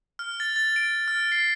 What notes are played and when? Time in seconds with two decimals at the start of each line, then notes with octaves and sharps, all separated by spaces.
0.19 F6
0.40 A6
0.56 A6
0.76 D7
1.08 F6
1.32 C7